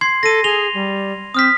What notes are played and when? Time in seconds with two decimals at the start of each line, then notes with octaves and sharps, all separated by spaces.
0.01 C6 G#6 C7
0.23 A4 A#6 D#7
0.44 G#4 F7 G7
0.74 G3
1.34 C4 D#6 F6 B6